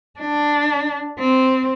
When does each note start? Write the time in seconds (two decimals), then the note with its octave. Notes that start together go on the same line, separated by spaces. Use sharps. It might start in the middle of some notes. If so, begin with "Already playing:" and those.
0.20 D4
1.19 C4